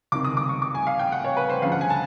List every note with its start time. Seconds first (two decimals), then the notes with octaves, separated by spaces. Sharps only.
0.12 C#2 C3 D#3 D6
0.25 D#6
0.37 D6
0.49 C#6
0.62 D6
0.75 G#5
0.87 F5
0.99 G5
1.12 F#5
1.24 C#5
1.37 B4
1.50 C5
1.62 D2 C#3 F3 F5
1.72 F#5
1.81 G#5
1.90 A5